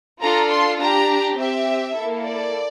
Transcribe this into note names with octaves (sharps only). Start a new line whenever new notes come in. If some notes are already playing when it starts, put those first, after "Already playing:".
D4 F4 A4 A#5
C6
D4 G4 A#5
C4 G4 E5
A#3 E4 A4
D5